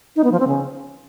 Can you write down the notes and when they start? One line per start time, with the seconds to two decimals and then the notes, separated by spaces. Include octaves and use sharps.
0.16 D#4
0.24 B3
0.32 F3
0.40 C4
0.48 C#3